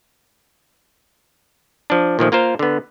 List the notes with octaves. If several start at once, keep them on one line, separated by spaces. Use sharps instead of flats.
F3 D4
A#2 D#3 F3 A3
A#3 F4 A#4 C5
D3 B3